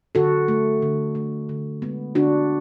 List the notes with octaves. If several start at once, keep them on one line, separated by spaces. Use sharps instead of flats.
D3 F#4 A4
A3
D3
A3
D3
G#3 B3
D3 D4 F#4